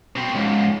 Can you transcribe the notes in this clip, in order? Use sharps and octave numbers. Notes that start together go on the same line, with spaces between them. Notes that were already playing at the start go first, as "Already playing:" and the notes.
B2 C4
C#2 G#2